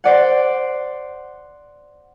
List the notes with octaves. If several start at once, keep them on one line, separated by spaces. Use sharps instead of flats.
C5 D5 F#5